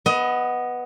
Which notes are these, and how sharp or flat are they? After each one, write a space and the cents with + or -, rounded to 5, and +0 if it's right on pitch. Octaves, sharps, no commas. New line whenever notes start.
B3 +0 D#5 +20